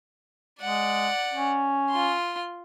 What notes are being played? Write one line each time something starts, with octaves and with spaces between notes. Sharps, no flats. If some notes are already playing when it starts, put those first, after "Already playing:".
G#3 D5 F#5
C#4
F4 C6